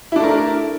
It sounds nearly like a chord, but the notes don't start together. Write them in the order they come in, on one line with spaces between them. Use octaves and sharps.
E4 D4 A3 A#4